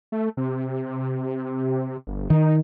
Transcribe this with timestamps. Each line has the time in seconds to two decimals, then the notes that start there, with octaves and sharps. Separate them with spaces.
0.12 A3
0.37 C3
2.07 G1
2.30 D#3 D#4